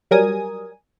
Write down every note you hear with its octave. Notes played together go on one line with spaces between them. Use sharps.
F#3 G3 A#4 G#5 D#6